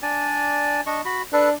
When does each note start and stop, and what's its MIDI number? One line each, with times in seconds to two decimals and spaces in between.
0.02 0.81 62
0.02 0.81 74
0.02 0.81 80
0.86 1.01 62
0.86 1.01 75
0.86 1.01 85
1.05 1.22 66
1.05 1.22 83
1.33 1.52 62
1.33 1.50 69
1.33 1.50 71